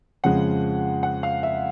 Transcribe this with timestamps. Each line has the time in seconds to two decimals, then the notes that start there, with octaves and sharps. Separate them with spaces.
0.24 F2 C#3 F3 G#3 F#5
1.03 F#5
1.23 F5
1.43 E5